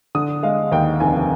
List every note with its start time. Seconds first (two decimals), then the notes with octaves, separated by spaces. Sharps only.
0.15 D3 D#6
0.43 G#3 F5
0.72 D#2 G5
1.00 F1 G#5